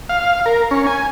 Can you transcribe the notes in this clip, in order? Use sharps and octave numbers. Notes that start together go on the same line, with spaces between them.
F5
A#4
C#4
G#5